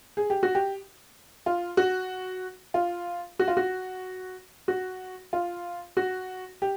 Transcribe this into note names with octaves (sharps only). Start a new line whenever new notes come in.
G#4
G4
F#4
G4
F4
F#4
F4
F#4
F4
F#4
F#4
F4
F#4
G4